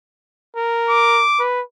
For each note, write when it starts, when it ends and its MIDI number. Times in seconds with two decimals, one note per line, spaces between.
0.56 1.23 70
0.89 1.43 86
1.39 1.62 71